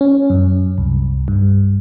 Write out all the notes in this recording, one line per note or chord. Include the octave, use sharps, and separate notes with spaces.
C#4
F#2
C2
G2